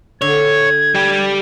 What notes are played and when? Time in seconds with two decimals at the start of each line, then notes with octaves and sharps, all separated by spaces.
0.22 D3 C#5 G#6
0.95 G3 G4